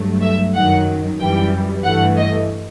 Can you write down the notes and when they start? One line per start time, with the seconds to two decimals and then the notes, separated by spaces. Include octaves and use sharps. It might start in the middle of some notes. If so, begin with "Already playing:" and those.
Already playing: G2 F#3 A3
0.22 E5
0.54 F#2 D#3 F#3 F#5
1.20 F#2 E3 G3 G5
1.84 G2 E3 A3 F#5
2.17 D#5